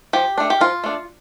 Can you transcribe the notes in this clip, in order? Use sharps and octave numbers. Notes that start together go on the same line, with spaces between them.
F3 G4
A3 D4
G4
F3 F4
A3 D4